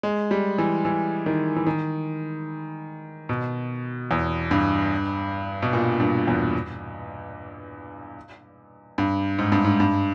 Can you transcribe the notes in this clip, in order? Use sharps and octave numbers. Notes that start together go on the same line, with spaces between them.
G#3
G3
E3
E3
D#3
E3
D#3
B2
E2
G2
B2
A#2
G2
E2
G2
G#2
G2
G#2
G2